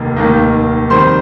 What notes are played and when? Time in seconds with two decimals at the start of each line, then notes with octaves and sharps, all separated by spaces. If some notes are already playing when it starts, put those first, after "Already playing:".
Already playing: F1 D#2 D#3 A#3
0.16 F1 D#2 D#3 A#3 D#4
0.90 F2 D#3 G3 C5 C6